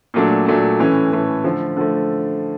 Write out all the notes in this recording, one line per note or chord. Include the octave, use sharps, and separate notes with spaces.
A#2 F#3 A3 D4
A#2 F#3 A3 D4
A2 E3 A3 C#4
A2 E3 A3 C#4
D3 F3 A3
D3 F3 A3